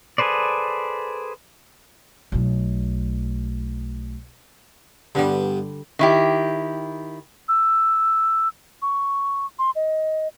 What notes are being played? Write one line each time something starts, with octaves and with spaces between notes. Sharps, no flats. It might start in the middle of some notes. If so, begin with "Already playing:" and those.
G#4 A4 B4 C5 D5
B1 A3
G2 D3 G3 B3
D#3 E4 G4
E6
C#6
C6
D#5